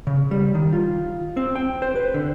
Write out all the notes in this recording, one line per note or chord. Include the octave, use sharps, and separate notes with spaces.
C#3
G3
D#3
F4
C4
G5
C5
B4
D3